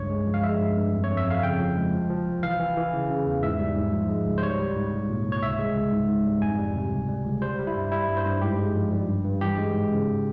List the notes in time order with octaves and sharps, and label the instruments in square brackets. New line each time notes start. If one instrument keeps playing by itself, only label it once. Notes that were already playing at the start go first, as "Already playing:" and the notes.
Already playing: [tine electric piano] C#2 G2 C#5
G#3
F3
F5
G#3 E5
G2
G2
F2
C#5
F2
E5
F2 F5
C#3 G5
F3
G#3
F3
F3
C2
E3 F5
E3
E3
C#3
C#3
E2
G#2 E5
G3
G#2
F3
G#3
C#2
C5
G3 C#5
G3
G#2
C2
A#2
C2
C#5
C#2 E5
G#3
C#2
G#2
G#2
G3
F2 G#5
G3
C3
C#2
G3
C#2
G3 C5
G3
E4
G2
G3 E4
G2
C5
G2
G#2 G4
G#3
F3
G3
G2
G2
E3 G4
G#3
G#2
C#3